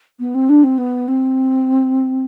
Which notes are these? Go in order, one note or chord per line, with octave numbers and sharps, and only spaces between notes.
B3
C4
D4
C4
B3
C4